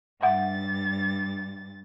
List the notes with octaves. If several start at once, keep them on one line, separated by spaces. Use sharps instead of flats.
G2 E5 F#5 A6